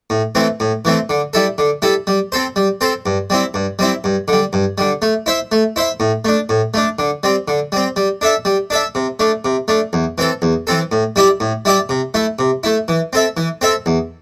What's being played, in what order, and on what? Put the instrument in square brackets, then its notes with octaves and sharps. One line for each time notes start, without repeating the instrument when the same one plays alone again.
[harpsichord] A2
E3 A3 C4
A2
E3 A3 C4
D3
G3 E4 A4
D3
G3 E4 A4
G3
C4 A4 C5
G3
C4 A4 C5
G2
G3 C4 E4
G2
G3 C4 E4
G2
D3 G3
G2
D3 G3
A3
E4 C5 E5
A3
E4 C5 E5
A2
A3 D4
A2
A3 D4
D3
G3 C4
D3
G3 C4
G3
D4 A4 E5
G3
D4 A4 E5
C3
A3 D4
C3
A3 D4
E2
E3 C4 A4
E2
E3 C4 A4
A2
G3 E4 G4 D5
A2
G3 E4 G4 D5
C3
A3 E4
C3
A3 E4
E3
C4 A4 E5
E3
C4 A4 E5
E2